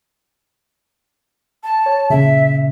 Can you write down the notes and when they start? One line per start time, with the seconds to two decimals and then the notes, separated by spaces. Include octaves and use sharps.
1.64 A5
1.86 C#5
2.10 A#2 C#3 E5